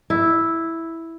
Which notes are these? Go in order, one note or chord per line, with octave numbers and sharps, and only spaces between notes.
E4